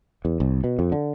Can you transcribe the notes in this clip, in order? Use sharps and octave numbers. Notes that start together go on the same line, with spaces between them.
E2
C2
B2
F2
D3